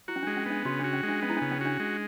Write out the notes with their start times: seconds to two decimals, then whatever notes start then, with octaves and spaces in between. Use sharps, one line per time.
0.08 E4 F#4
0.16 C#4
0.23 G#3 D4
0.37 C#4
0.46 B3 D4
0.65 C#3 F#4
0.79 D4 F#4
0.93 C#4
1.03 G#3
1.08 D4
1.22 B3 C#4
1.30 E4
1.37 C#3 D4
1.51 C#4
1.61 D4 F#4
1.80 G#3